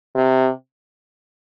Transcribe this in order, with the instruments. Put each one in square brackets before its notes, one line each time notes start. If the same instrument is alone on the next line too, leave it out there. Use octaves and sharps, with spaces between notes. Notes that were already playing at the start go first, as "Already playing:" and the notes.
[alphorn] C3